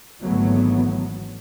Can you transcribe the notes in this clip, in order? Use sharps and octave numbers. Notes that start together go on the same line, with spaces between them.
G#1 D3 E3 F#3 A3 B3